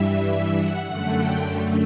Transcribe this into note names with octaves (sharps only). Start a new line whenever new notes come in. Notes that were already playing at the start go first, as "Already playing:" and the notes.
Already playing: G2 E3 G3 E5
F#5
F#2 D3 A3 F#5
G5